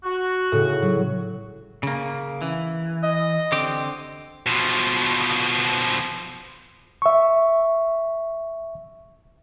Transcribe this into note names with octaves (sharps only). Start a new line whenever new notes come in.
F#4
A2 C#3
F#3
C#3 A#3
E3
D#5
D3 C4 G4
B2 F3
E5 C#6